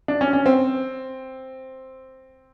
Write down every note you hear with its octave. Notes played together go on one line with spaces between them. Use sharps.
D4
C#4
C#4
C4